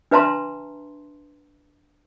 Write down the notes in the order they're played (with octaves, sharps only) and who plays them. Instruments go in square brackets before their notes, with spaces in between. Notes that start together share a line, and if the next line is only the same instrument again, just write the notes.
[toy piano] D4 B4 E5 A5 A#5 C6